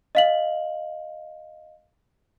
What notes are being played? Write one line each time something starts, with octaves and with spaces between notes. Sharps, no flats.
D#5 F5 F#7